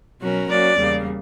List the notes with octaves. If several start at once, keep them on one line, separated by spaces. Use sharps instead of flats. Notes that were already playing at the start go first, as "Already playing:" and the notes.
B2 F#3 C#4 F#4 A#4
F#3 A#3 C#4 F#4 D5
E2 C#3 G3 A#3